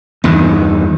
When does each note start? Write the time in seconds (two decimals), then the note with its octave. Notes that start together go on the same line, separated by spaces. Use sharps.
0.24 E2 G2 D#3